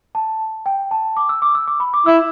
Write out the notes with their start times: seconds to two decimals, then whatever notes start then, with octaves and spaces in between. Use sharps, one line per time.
0.15 A5
0.66 G5
0.91 A5
1.17 D6
1.29 E6
1.42 D6
1.55 E6
1.68 D6
1.80 B5
1.94 D6
2.06 E4 E6